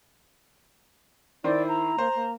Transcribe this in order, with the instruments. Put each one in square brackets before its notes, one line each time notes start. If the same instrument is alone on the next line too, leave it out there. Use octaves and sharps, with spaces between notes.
[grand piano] D#3 C5 [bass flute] E4 [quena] D5
[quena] A#5
[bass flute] A#3 [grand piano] C5
[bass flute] A#3